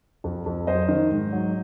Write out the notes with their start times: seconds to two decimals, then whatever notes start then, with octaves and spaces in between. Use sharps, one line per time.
0.24 F2
0.46 F2
0.67 F#3 C5 D#5
0.89 D#3
1.11 G#2
1.32 F#3